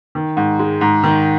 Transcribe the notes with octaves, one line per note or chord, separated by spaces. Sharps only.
D#3
G#2
G#3
G#2
D#3